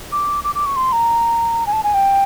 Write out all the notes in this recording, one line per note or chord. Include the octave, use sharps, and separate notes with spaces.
D6
D6
D6
C#6
C6
A#5
G#5
A5
G#5
G5